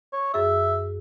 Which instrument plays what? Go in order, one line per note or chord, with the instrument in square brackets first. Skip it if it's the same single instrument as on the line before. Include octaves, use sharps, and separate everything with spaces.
[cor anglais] C#5
[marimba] F#2 G#4 [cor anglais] E5